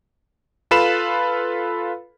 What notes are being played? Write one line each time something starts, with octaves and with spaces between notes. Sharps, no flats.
F4 A4 B4 F5 B5 E7